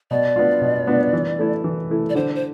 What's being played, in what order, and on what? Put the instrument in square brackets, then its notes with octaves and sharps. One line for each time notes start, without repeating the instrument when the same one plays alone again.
[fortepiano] B2 [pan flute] D5
[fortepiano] B3 D4 F4
B2
B3 D4 F4
E3
A3 E4
E3
A3 E4
[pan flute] D5
[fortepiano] D3 [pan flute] C5
[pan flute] C5